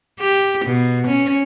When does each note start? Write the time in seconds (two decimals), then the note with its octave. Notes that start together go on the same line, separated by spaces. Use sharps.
0.20 G4
0.66 B2
1.08 C#4